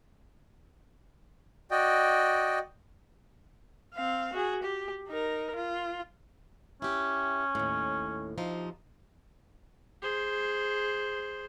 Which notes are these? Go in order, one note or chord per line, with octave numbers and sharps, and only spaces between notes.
F#4 D5 D#5 G5
C4 F5
F#4 G#4
G4
D#4 A#4
F4
C#4 E4 G4
D#2 A2
C3 F3 D#4
G#4 C5